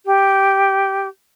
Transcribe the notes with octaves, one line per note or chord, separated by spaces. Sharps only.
G4